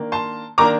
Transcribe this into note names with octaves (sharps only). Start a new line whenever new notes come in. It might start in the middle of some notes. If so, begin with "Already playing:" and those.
Already playing: D#3 A#3 D4
A5 C6
D#3 A#3 D4 A#5 D6